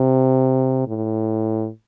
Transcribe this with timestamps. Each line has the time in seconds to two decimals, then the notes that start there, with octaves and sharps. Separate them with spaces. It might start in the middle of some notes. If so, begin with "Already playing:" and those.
Already playing: C3
0.87 A2